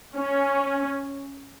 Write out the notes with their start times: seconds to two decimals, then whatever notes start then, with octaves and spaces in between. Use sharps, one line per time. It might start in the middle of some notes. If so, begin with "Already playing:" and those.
0.17 C#4